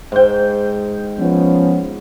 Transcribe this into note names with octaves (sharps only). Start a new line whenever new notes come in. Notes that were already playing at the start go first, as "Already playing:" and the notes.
G#2 G5
F3 B3 C#4